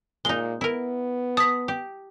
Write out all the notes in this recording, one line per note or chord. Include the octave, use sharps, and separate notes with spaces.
A#2 G#3 D#4 G7
B3 E4 A#4
A5 D#6 B6
G4